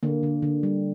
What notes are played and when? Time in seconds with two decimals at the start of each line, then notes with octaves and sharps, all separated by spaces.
0.03 D3 A#3
0.23 D3
0.42 D3
0.63 G3